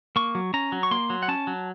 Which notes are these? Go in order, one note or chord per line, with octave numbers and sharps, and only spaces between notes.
A#3 C#6
F#3
C#4 A#5
F#3
C#6
A#3 C6
F#3
F#5
C#4 A5
F#3